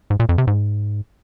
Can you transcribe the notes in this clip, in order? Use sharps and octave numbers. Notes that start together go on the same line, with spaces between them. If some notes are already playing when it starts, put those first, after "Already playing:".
G#2
A#2
F2
C3
G#2